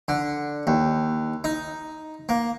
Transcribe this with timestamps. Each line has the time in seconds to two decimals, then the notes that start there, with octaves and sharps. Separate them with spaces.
0.08 D3
0.67 D#2
1.44 D#4
2.29 A#3